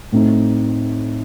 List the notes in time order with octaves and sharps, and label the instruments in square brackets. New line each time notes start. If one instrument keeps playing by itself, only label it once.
[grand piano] A2 A3 C4 D#4